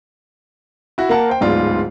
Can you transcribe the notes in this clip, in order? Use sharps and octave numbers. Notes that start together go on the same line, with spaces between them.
E4 F#4
A#3 A#4 F#5 A5
C5 G5
D1 G#2 B3 F4 D5